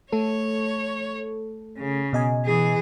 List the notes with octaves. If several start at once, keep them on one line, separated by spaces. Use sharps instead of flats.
A3 A4 C#5
C#3
B2 D#5 G#5
E3 G#4